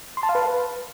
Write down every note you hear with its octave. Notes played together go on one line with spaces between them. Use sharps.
C6
A5
F5
B4